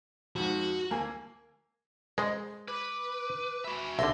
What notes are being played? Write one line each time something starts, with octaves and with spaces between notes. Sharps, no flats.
F2 G#2 F#4
D2 A#3 G#5
G#3 C5 D#5
B4 D6
F#4 E5 B5
C2 D3 E5 C6 A#6